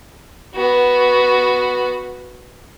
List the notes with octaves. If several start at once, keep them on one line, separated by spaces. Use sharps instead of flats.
B3 F#4